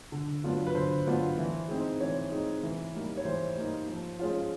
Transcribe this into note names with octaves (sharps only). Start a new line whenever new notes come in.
D3
F#3 B3 D4 F4
B4
D3 C5
F#3 B3 D4 F4
E3
G#3 C4 D#4
E3 C#5
G#3 C4 D#4
E3
G3 A#3 D#4
C#5
E3 C5
G3 A#3 D#4
F3
G#3 C#4 F4